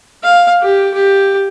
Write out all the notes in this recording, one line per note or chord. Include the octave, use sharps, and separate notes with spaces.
F5
G4
G4